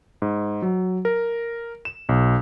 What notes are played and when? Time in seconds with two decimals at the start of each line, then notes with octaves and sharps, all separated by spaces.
0.22 G#2
0.62 F#3
1.05 A#4
1.85 E7
2.09 B1